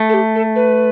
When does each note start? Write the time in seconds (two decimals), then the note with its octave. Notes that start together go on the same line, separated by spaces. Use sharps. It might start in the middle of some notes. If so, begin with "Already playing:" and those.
Already playing: A3
0.09 A4
0.14 G4
0.35 A4
0.56 B4